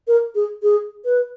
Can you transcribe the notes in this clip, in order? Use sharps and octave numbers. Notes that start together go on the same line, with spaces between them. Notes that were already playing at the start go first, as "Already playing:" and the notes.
A#4
G#4
G#4
B4